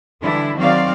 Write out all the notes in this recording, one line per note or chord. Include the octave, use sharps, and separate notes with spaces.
D3 E3 G3 D4 E4
D#3 F#3 C4 F#4 D5 F5